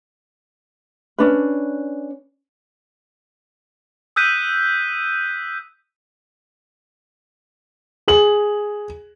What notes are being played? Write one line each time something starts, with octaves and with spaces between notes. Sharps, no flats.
C#4 D4 B4
D#6 E6 F#6 G6 B6 D#7
G#4 F#7